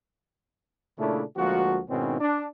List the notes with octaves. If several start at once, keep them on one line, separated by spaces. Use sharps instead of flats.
A#2 C#3 A3 C#4 D4 E4
D2 F3 G#3 A#3 F#4
G#2 B2 D#3 C4 C#4 E4
D4